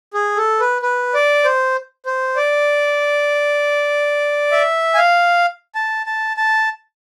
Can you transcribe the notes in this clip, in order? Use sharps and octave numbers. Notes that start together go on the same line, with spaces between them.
G#4
A4
B4
B4
D5
C5
C5
D5
E5
G#5
F5
A5
A5
A5